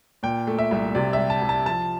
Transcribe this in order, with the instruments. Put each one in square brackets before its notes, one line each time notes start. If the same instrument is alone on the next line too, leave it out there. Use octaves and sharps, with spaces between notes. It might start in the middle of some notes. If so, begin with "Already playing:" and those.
[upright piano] A#2 [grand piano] G5
[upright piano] A3
[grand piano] E5
[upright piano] C2
[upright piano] C3 [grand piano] D5
[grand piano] E5
[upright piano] G3
[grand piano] A5
[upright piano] C2
[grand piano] A5
[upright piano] F3 [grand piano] A5